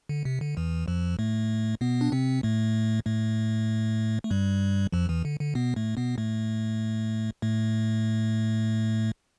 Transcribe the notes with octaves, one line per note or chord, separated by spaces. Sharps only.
D3
C3
D3
E2 E3
F2 F3
A2 A3
B2 B3
D4
C3 C4
A2 A3
A2 A3
A3
G2 G3
F2 F3
E2 E3
D3
D3
B2 B3
A2 A3
B2 B3
A2 A3
A2 A3